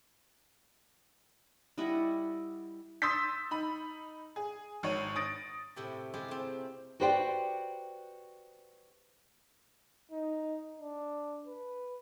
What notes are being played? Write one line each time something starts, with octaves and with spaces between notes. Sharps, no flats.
G3 E4 D#5 F#5
C6 D#6 E6 G6 A6 B6
D#4 B5
G#4
G#1 C#5 D#7
D#6 A6 A#6 D7
A2 C3 E4 G4
G#3 E4 F4 G4 G#4
A3 C4
F#4 G4 B4 C5 D5 G5
D#4
D4
B4